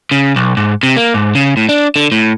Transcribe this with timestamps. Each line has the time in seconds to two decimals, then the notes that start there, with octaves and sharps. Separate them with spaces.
0.11 C#3
0.36 B1
0.57 G#2
0.83 C3
0.96 A#3
1.14 G#2
1.35 C#3
1.57 A2
1.69 D4
1.96 D3
2.12 A2